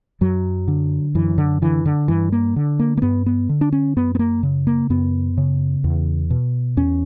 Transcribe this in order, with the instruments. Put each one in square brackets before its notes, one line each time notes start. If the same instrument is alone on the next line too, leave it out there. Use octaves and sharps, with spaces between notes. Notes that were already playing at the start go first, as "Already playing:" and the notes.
[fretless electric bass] F#2 F#3
D3
F#2 E3
D3
D3 E3
D3
G2 E3
A#3
D3
A#3
A#3
G2 B3
B3
D3
D4
C#4
F#2 B3
B3
A#3
C#3
A#3
F#2 B3
C#3
E2
B2
E2 C#4